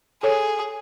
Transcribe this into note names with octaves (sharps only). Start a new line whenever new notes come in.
G#4 A4 C#5